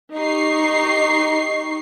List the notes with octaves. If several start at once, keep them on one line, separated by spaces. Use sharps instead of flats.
D#4 G4 C#6 C7